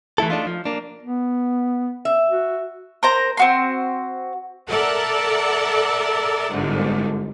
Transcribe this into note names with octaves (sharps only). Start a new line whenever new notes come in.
E3 A3 E4 A4
A3 D4 D#4 F4
F3
A#3 D4
B3
E5
F#4
A#4 C5 A#5
C4 F#4 C6
A4 A#4 D5 E5 F#5
G1 C2 G#2 D3